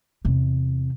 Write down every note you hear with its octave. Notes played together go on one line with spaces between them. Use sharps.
E2 C3